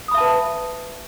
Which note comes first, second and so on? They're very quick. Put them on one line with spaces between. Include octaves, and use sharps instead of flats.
D#6 B5 E5 A5 B4